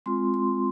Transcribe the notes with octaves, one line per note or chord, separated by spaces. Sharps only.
G#3 C4 F4 C6
C6